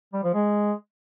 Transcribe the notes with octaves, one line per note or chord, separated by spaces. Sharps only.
G3
F3
G#3